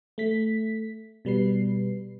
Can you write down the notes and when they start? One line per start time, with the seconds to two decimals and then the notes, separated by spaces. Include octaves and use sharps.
0.18 A3 B6
1.25 B2 G3 B4 C7